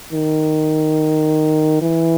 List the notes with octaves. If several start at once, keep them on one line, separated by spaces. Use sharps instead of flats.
D#3
E3